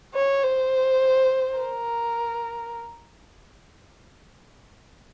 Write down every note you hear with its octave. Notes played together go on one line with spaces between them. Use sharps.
C#5
C5
A#4